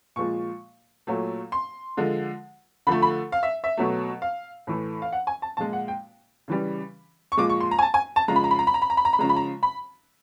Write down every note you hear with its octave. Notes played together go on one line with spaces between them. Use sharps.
A#2 F3 G#3 C#6
A#2 F#3 A3
C6
D3 F3 G#3
D3 F3 A3 B5
B5
F5
E5
E5
B2 F#3 A3
F5
A2 E3 A3
F5
F#5
G#5
A5
A#2 F3 G#3 A5
F#5
G5
C#3 E3 G3
C#6
A#2 F3 G#3 D6
C#6
C6
A#5
G#5
A5
G#5
A5
C#3 F3 G#3 A#5
B5
A#5
B5
A#5
B5
A#5
B5
A#5
B5
A#5
B5
C#3 F3 G#3 A#5
B5
A#5
B5